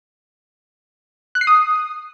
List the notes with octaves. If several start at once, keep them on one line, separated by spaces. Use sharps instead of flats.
F#6
C7
D#6